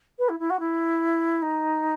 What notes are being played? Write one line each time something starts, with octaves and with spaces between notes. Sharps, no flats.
B4
E4
E4
F#4
E4
D#4